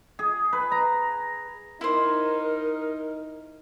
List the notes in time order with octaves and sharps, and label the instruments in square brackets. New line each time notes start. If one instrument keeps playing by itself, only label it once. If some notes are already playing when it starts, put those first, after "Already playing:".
[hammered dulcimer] G#4
B4
A#5
[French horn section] D#4 [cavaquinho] E4 C5 [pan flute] A#4